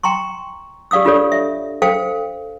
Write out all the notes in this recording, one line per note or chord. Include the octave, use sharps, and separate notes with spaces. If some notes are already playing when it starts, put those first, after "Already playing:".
G5 A#5 C6 C#6
G4 D5 F5 D#6 E6
D4 F4 G4 A4 C#5 D5
E5
A4 C5 F5 G5